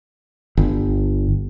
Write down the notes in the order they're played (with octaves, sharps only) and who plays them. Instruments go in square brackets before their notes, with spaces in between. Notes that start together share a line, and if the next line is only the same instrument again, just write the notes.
[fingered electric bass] G1